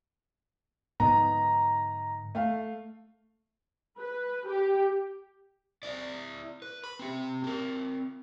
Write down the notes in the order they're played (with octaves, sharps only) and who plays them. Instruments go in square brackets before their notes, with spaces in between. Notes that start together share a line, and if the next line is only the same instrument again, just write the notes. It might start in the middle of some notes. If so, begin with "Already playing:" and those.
[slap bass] G#2 D3 F3 [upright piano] B3 D#4 [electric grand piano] A#5
[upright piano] A3 F5
[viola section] B4
G4
[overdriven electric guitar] E4 D5
B4
B5
C4 G4
C4 A#4